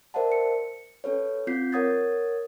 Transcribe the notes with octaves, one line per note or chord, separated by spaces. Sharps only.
A#4 C5 D5 E5 F#5 A5
C#7
C#4 A4 B4 C#5
C4 F4 G6 B6 C7
A#4 C#5 F#5 D#6 G#6 A6